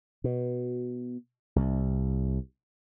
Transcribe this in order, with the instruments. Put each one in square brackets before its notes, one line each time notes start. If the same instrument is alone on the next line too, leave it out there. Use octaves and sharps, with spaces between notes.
[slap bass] B2
C2